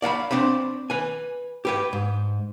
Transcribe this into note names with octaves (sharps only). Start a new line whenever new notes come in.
D5 F5 F#5 B5
C4 D4 C5 B5
B4 G#5
G4 B4 G5
G#2